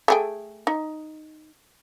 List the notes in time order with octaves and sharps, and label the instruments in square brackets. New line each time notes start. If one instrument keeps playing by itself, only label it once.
[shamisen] A3 G#4 G5
D#4